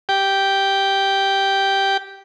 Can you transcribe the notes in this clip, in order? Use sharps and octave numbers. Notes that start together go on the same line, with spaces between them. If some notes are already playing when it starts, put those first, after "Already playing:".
G4 G5